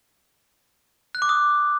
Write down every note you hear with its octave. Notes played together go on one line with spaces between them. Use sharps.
F#6
D6
D#6